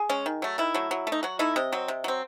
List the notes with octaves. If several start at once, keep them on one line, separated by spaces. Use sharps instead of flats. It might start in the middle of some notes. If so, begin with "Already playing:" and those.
Already playing: G#4
G#3 C#4
D#3
F#3 A3
D#3 E4
F#3 A3
F#3
A3
D#4
F#3 F#4
A3 D#4 E4
C3 D#5
F#3 C4
C3
F#3 C4